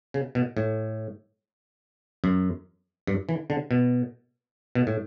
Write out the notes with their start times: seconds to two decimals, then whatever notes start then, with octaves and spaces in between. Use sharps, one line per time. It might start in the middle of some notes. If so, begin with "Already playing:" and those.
0.14 C#3
0.35 B2
0.57 A2
2.24 F#2
3.07 G2
3.29 E3
3.50 D3
3.71 B2
4.75 B2
4.87 A2